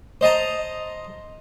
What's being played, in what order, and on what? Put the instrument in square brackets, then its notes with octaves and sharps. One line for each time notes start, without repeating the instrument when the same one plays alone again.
[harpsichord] C5 D#5 A5 A#5